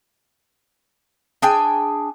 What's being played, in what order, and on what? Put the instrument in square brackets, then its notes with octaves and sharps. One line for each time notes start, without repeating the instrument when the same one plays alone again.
[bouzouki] D4 G#4 G5 G#5